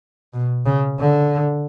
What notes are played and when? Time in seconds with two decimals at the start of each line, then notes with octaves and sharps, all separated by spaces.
0.33 B2
0.66 C#3
0.99 D3